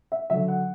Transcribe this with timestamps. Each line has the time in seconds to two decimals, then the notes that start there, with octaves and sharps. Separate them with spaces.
0.12 E5
0.30 D3 F#3 E5
0.48 F#5